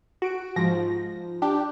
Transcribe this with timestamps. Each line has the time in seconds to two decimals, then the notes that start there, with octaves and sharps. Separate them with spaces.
0.22 F#4 D7
0.56 G#2 F3 A#6
1.42 D4 G4